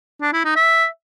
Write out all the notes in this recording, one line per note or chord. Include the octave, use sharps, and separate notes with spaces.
D4
E4
D#4
E5